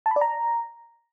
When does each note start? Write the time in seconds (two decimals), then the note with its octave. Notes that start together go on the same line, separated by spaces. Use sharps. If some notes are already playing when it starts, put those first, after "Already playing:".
0.06 A5
0.11 B5
0.16 D5
0.21 A#5